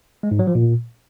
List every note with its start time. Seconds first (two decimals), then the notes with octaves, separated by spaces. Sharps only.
0.23 G#3
0.31 G#2
0.39 F#3
0.47 F3
0.55 A#2